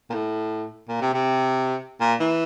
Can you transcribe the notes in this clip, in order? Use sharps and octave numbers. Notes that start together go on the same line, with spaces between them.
A#2
A2
A#2
C3
C3
A#2
E3